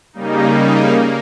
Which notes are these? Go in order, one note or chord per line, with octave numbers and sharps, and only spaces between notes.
C#3 G3 A#3 D#4
A#3